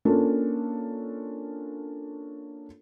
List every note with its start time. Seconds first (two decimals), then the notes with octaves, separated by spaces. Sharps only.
0.05 A#3 C#4 D4 F4 A4